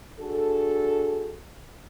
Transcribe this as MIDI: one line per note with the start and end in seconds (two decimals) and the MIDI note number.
0.20 1.36 62
0.20 1.36 66
0.20 1.36 68
0.20 1.36 69